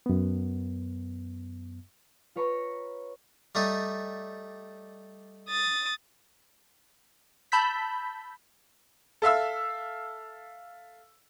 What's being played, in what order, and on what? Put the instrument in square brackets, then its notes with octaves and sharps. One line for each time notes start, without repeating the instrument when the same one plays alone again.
[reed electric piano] F#2 B3
[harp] F4 B4 C#5 A#5 B5 C#6
[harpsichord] G3 A3 D#4
[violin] D#6 A6
[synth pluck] A5 B5 E6 G6 B6
[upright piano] A4 E5 F5 E6